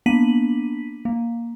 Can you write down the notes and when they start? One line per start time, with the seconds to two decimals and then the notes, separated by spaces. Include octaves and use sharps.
0.06 A#3 B3 D4 B6 D#7 F#7
1.05 A#3